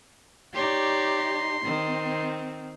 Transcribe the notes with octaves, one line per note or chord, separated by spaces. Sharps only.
D#4 G4 C#5 D5 C6
D#3 C4